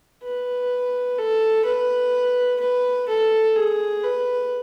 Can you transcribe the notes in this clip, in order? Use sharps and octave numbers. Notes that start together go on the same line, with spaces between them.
B4
A4
B4
B4
A4
G#4
B4